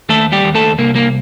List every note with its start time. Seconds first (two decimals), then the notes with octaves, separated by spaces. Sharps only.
0.09 D#2 A3 A4
0.32 G3 G4
0.44 D#2
0.55 A3 A4
0.78 C2 A#3
0.95 A#3